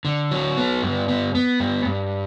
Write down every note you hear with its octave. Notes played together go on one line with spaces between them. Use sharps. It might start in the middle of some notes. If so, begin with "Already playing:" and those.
D3
F#3
B3
G2
B3
B3
G2
G2